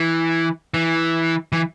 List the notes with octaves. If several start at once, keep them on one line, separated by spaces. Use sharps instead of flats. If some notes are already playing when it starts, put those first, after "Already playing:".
Already playing: E3
E3
E3